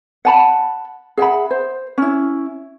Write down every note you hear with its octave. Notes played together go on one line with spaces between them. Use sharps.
F#5 A5 B5
G#4 E5 F#5 B5
C5
C#4 E4